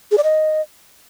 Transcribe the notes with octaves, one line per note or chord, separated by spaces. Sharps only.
G#4
D5
D#5